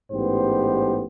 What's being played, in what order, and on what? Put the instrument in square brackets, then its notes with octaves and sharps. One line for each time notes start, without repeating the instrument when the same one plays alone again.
[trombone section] A1 G#2 B3 G4 C5